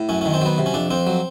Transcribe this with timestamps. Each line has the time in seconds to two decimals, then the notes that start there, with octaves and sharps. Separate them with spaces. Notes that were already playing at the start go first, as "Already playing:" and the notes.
Already playing: A2
0.09 F#2 C#4
0.21 D#3 C#4
0.34 C4
0.41 F#3 B3
0.58 C3
0.66 C#4
0.74 F2 D4
0.91 F2 C4
1.07 F#3